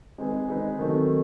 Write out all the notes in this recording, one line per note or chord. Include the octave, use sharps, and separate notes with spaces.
G#3 C4 D#4 G#4 B4
G#3 C4 D#4 G#4 B4
D#3 F#3 A3 C4